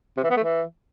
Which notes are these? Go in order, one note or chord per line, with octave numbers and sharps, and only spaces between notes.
C3
E3
B3
A3
E3